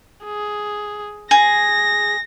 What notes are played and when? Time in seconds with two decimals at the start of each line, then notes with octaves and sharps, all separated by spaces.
0.25 G#4
1.31 G#4 A#6